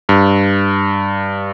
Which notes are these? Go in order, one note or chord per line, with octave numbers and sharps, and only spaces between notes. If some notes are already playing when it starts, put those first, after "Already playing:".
G2